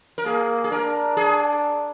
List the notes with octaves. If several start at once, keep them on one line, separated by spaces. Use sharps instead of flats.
A#4
A#3 G#4
G#4
D4 A#4
G#4